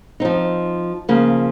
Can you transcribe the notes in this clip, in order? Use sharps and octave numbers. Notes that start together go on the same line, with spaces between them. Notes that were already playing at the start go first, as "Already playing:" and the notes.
F3 C4 D#4
C#3 F3 A#3